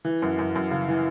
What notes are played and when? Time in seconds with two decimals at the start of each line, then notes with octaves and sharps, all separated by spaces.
0.05 E3
0.22 F#2
0.39 F#2
0.56 F#2
0.71 C#3
0.88 E3